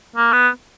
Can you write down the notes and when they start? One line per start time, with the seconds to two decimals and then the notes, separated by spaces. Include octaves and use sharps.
0.16 A#3
0.33 B3